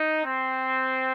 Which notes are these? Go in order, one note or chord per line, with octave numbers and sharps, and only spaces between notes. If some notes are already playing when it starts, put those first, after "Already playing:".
Already playing: D#4
C4